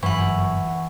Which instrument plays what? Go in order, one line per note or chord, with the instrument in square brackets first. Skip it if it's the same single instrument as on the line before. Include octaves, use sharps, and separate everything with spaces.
[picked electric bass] G1 F#2 [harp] E3 [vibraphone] F#5 C#6